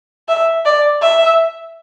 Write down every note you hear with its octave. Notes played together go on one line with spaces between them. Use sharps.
E5
D5
E5